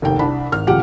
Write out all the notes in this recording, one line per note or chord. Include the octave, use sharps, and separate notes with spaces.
F1 D#2 G5
C2 D4 B5
G#1 F6
D#1 C#2 F3 G4 F#5